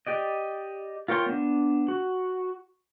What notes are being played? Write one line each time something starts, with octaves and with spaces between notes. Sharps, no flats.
G4 D5 D#5
F4 A#4 C#5 G5 C6
B3 D4
F#4